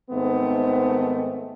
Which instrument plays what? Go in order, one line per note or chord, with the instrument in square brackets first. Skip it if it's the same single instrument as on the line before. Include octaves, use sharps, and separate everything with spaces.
[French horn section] G#2 D#3 A3 B3 C4